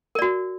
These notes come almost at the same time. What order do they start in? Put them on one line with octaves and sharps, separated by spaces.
A#4 D5 F#4